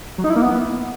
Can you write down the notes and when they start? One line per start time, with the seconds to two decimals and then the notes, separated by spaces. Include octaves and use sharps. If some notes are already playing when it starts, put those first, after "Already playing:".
0.18 F#3
0.24 D#4
0.30 E4
0.36 A#3
0.42 B3